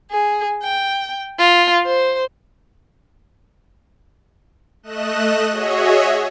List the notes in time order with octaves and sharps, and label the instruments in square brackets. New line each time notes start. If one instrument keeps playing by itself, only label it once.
[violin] G#4
G5
F4
C5
[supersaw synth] A3 D#5 F#6 E7
F#4 G#4 C#5 D#5 E5